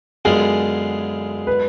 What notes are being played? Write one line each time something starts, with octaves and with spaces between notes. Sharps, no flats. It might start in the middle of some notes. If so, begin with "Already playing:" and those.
F#2 D3 G#3 B3 F4 G#4
B4